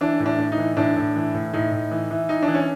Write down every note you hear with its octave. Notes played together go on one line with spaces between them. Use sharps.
E3 D4
A2
D4
A2
D#4
E3
A2 D4
A2
E3
A2
A2 D#4
A2
E3
E3
E3 D#4
D4
E3
C#4